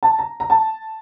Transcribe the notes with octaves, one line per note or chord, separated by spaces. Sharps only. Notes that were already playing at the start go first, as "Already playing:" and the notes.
A5
A#5
A#5
A5